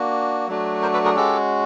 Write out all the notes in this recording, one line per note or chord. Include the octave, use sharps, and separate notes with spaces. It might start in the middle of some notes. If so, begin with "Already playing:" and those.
Already playing: A#3 D4 F#4
F#3 A3 D4 F#4
A#4 C5
A4 B4
G#4 A#4
G#3 C#4 F#4 G4 A4